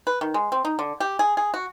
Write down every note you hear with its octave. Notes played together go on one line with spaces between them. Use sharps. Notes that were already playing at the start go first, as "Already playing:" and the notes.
B4
D#3
G#3
C4
D#4
D3
G4
G#4
G#4
F#4